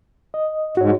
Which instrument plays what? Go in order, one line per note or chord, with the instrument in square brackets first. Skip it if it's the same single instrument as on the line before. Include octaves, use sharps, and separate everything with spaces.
[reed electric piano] D#5
[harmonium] G#2 [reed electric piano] F#4 C#5